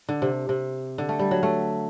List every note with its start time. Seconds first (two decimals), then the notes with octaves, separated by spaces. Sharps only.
0.09 D3
0.22 C3
0.49 C3
0.98 D3
1.09 A3
1.19 G3
1.31 F#3
1.43 A3